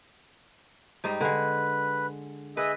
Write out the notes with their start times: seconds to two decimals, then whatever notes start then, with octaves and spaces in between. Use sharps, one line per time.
1.04 G#2 G3 D#4
1.21 D3 G#3 B4
2.57 G#4 B4 D#5 E5